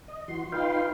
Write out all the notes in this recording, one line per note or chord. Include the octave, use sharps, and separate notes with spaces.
D#5
E3 F#4 C6
D#4 F4 B4 F5 G5 C6